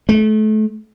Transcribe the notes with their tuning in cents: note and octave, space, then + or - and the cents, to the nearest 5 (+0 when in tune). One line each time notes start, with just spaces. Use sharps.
A3 -30